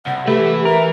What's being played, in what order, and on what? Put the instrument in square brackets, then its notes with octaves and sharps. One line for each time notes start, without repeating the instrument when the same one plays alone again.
[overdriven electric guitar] C2 [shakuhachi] F#5
[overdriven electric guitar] E3 B4 [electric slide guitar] A3 [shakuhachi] G4
[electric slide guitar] A#4 [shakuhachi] E5